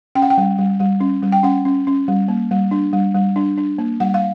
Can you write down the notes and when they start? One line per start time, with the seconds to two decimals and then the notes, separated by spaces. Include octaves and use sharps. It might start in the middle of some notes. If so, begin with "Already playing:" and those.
0.15 C#4 G5
0.22 F#5
0.30 G5
0.38 G3
0.58 G3
0.80 G3
1.00 C#4
1.23 G3
1.32 G5
1.43 C#4 F#5
1.65 C#4
1.87 C#4
2.08 G3
2.28 A#3
2.51 G3
2.71 D4
2.93 G3
3.15 G3
3.36 D4
3.58 D4
3.78 A#3
4.00 G3 F#5
4.14 F5